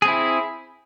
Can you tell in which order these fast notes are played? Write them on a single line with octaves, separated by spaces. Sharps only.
G#4 C4 E4